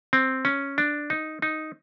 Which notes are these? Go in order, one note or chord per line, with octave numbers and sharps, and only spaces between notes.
C4
C#4
D4
D#4
D#4